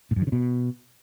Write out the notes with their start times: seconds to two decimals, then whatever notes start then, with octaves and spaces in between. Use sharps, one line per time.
0.11 A2
0.16 F#2
0.22 D#3
0.27 C#3
0.32 B2